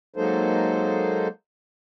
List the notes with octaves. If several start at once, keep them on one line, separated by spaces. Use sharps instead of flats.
F#3 G#3 A#3 D#4 A4 C5